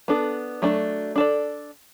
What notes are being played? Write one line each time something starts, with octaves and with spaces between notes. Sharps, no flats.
B3 D4 A4
F#3 A3 D4 A4
D4 A4 D5